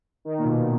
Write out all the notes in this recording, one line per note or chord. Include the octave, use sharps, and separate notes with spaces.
D#3
A#2
B2